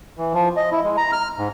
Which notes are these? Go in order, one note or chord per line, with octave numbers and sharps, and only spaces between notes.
E3
F3
D#5
E4
G#3
A#5
F6
G#2